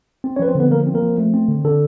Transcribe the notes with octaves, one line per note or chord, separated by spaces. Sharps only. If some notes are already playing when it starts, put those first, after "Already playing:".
C4
C#4 C#5
F3 B4
C4 C5
D3
B3 B4
F3 A#3 A#4
C4
A#3 A#4
F3
A3
C4
D3
D3 A4